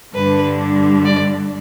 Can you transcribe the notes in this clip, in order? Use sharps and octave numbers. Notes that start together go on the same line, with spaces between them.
G2 D3 G3 D4 B4
D5